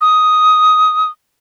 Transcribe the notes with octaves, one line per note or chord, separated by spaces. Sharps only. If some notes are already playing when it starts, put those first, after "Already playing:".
D#6